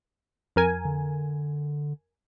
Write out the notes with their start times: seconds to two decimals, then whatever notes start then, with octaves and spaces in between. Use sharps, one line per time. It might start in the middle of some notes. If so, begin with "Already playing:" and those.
0.56 F2 A#4 G#5
0.85 D3